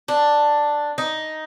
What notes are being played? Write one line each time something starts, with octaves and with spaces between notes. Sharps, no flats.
D4
D#4